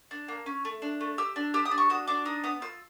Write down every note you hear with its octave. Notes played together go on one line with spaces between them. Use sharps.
D4
A#3
C#4
A3
D4
A3
G4 E6
D4
G4 E6
D#6
D4
C#6
F#4 D#6
D4 D6
D#4 D#6
B3 D#6
F4 E6